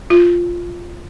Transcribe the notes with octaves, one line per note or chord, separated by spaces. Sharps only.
F4